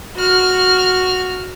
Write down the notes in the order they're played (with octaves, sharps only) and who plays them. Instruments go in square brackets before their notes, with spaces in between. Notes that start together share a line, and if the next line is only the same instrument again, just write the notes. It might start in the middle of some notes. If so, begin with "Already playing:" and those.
[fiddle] F#4 F6